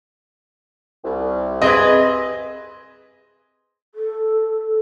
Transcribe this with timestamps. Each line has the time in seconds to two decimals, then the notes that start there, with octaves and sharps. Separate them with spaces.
1.04 C2
1.62 C4 G#4 B4 D#5
3.95 A4